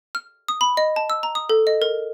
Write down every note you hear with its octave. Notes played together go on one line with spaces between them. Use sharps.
F6
D#6
B5
D#5
A5
E6
A#5
D#6
A4
D#5
A#4